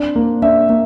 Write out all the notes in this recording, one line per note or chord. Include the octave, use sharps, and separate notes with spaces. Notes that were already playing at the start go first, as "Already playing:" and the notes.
Already playing: C4 D4
A#3
D4 E5
A#3